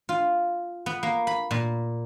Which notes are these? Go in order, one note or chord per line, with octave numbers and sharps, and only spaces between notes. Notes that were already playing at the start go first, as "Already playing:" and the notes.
F4
B3
A#3
B5
A#2